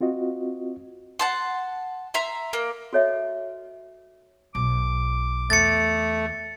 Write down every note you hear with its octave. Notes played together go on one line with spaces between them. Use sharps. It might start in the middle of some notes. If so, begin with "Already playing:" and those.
C4 F4 F#4 D#5
F#5 A5 C6
E5 A#5 C6
A#3
F#4 A4 C#5 D#5 E5
B1 D6
E2 A3 A6 C#7